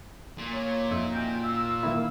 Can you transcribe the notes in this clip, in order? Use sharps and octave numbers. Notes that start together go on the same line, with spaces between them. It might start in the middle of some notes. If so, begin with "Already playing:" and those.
A#2
C#5
F2 D#4 E5
C#4 F#4 G5
F5 E6
D#3 A#3 E4